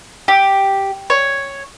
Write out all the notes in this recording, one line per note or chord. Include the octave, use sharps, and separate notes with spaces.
G4
C#5